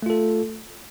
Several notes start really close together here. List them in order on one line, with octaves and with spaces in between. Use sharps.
A3 F4 A4